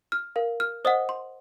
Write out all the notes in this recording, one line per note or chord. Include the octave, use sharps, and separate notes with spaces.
F6
A#4 F5
F6
C5 D#5 F#5 D#6
C6